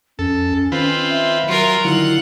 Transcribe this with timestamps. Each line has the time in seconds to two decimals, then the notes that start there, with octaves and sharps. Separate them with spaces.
0.19 F2 C#4 A4
0.72 D#3 C4 F4 B4
1.10 E5
1.49 F#3 F4 A#4
1.85 D3 D#3 F#3 E4 F4 F#5